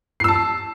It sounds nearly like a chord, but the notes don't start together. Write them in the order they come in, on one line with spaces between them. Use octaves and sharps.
C7 E6 A5